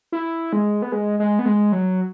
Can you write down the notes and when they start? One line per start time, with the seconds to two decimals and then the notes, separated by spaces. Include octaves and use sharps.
0.12 E4
0.53 G#3
0.82 B3
0.92 G#3
1.19 G#3
1.39 B3
1.46 G#3
1.72 F#3